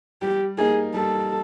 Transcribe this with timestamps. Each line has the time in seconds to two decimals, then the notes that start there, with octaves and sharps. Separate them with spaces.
0.22 G3 G4
0.58 A#3 D#4 G#4
0.94 G3 A4